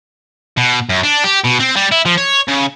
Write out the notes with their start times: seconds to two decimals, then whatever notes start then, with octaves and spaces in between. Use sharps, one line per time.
0.57 B2
0.89 F#2
1.03 D4
1.24 G4
1.44 B2
1.59 C4
1.76 G3
1.92 E4
2.05 F3
2.18 C#5
2.48 C#3